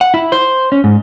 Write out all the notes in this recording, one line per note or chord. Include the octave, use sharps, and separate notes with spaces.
F#5
E4
C5
C#4
G#2